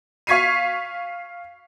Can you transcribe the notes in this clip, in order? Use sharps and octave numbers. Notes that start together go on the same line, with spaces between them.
F5 C#6 G#6 B6 C7 D#7